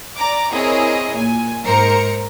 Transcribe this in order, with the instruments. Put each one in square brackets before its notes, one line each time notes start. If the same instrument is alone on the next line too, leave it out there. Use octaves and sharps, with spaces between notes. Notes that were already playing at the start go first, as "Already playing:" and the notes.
[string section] D5 A#5 D6
C4 E4 G#4 A#4 C#5 D#5
A#2 G#5
G#2 A#4 C5 A#5 C#7